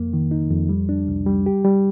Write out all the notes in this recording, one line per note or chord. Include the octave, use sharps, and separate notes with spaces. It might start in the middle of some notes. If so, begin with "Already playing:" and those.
Already playing: F2 A#3
D#3
D#4
F2
G3
D4
C2
G3
G4
G3